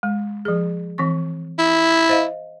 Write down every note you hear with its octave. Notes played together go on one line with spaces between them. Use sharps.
G#3
F3 G#4
E3 C4 C#6
E4
C5 D#5 F5